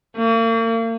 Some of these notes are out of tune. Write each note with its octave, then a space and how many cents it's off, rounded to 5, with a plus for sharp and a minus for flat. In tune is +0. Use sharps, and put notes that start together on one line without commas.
A#3 -40